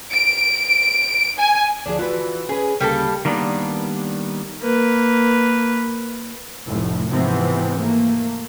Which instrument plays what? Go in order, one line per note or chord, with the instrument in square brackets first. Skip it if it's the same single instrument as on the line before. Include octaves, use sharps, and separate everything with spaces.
[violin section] D7
G#5
[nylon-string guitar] D2 F3 G#4 [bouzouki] D4
[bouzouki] E3 [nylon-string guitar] F4 F#4 B4
[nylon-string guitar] C#4 B4 [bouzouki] G#4
[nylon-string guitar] D2 C#3 [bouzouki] G3 A#3 A4
[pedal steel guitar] D#3 G3 A#3 B3 D4
[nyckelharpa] A#3 B4
[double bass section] F1 A2 F3
G#2 C3 E3 F3 B3 C4
A3 A#3